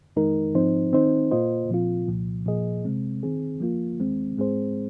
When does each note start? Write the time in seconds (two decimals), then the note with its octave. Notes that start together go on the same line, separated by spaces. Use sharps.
0.16 F2 D#3 G#3 D#4 A#4
0.55 G#2 F3 C4 D#4 C5
0.93 D#3 C4 D#4 C5
1.31 A#2 A#3 F4 C5 D#5
1.70 A#2 F3 C4 F4
2.08 C2 A#2 F3
2.46 A#2 F3 A#3 G#4 D#5
2.85 C3 G#3 C4
3.23 D#3 C4 G#4
3.60 F3 A#3 F4
3.99 D#2 D#3 G#3 C4
4.37 G#2 G#3 C4 G#4 C5